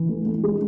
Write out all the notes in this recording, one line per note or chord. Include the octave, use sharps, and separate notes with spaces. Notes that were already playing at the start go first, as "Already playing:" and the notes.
Already playing: E3
A3
A3
G#3